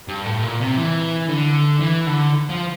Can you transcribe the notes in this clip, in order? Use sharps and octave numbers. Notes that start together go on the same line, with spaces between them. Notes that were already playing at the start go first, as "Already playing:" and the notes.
G2
A2
A#2
C3
E3
D3
E3
D3
F3